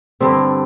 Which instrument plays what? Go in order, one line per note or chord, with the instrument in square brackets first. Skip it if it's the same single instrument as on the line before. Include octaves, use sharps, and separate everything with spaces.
[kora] G2 D3 G3 C4